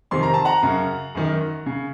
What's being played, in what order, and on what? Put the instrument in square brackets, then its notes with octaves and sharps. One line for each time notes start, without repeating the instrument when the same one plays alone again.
[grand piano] F2 C3 D#3 C6
A#5
A5
F#5 A#5
F#2 C#3
F#2 D#3
C#3